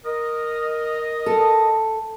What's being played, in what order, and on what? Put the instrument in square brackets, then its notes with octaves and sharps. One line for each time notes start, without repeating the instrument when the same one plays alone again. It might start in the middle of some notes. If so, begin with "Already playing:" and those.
[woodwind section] A#4 D#5
[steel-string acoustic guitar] A4